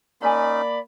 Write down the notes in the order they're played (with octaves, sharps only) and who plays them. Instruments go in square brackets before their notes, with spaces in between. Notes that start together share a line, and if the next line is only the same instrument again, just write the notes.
[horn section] A#3 B5 [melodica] C#4 D#4 [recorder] D5 [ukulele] G#5 A5